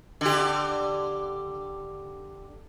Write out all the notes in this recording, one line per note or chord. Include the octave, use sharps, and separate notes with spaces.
D3 G4